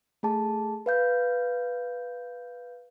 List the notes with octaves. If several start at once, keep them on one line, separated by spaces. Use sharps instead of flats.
A3 G#4 A5
B4 F5 G6